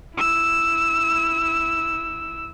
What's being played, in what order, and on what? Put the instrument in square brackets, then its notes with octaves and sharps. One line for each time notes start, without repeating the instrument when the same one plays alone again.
[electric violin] E4 E6